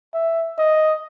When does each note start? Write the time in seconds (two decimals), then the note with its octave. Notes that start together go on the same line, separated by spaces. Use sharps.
0.14 E5
0.58 D#5